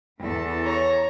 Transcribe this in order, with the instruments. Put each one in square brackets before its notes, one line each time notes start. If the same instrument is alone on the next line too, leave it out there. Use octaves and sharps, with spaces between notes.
[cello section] E2 E3 A4
[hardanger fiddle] C#5 A#5